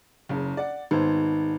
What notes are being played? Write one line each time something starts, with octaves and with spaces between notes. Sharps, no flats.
F#1 C#3
D5 F#5
G#1 B3 D#4 C5